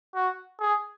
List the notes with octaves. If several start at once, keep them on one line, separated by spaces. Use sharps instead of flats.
F#4
G#4